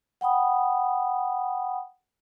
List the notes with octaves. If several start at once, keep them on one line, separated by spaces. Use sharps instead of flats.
F#5 G5 B5 D#6